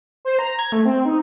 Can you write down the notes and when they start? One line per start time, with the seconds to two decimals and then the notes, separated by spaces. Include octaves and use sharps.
0.25 C5
0.39 A#5
0.59 G#6
0.72 A3
0.85 C4
1.05 D#4